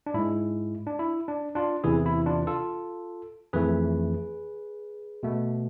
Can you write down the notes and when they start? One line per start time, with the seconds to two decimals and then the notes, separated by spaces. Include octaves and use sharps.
0.06 D4
0.14 G#2 G#3 E4
0.86 D4
0.99 E4
1.28 D4
1.55 D4 F4
1.84 E2 C3 E3 E4 G#4
2.06 E4
2.26 D4 F4
2.47 F4 A4
3.53 F2 E3 A3 G#4 B4
5.23 B2 A3